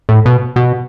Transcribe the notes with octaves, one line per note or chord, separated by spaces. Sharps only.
A2
B2
B2